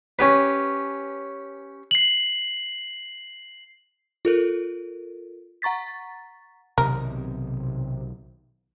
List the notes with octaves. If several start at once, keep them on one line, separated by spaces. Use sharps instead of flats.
C#4 G4 B4
C7 F#7
F4 A4 A#4
F#5 A#5 C#6 A6 B6
B1 C3 D#3 A#4